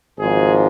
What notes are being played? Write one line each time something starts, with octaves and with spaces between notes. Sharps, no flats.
G#1 G#2 F3 G#4